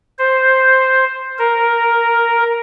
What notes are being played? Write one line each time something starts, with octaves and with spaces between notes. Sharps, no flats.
C5
A#4